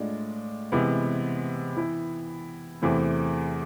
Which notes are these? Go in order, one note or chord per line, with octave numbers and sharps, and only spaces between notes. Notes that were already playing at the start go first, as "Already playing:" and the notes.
Already playing: A2 G#3 D4 F4
C3 E3 G#3 B3
E3 B3 E4
E2 C3 E3 A3 C4